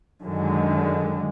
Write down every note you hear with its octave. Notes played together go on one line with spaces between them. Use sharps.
F#2 D3 D#3 G#3